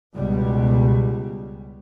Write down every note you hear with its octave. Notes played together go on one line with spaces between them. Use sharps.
C#2 B2 G3